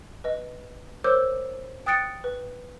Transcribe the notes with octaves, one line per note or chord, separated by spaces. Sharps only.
B4 D#5
A#4 C5 C#5 D6 E6 G6
G5 D#6 F#6 A6 C#7 D7
B4